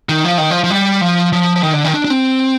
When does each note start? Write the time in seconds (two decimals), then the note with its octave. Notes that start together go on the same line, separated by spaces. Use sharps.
0.09 D#3
0.25 F3
0.38 D#3
0.51 F3
0.64 F3
0.70 G3
1.01 F3
1.32 F3
1.56 F3
1.63 D#3
1.73 D3
1.84 D#3
1.94 D4
2.05 D4
2.10 C4